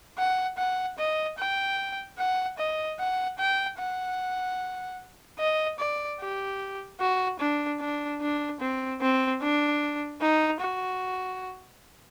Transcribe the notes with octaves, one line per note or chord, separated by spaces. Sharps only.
F#5
F#5
D#5
G5
F#5
D#5
F#5
G5
F#5
D#5
D5
G4
F#4
D4
D4
D4
C4
C4
D4
D#4
F#4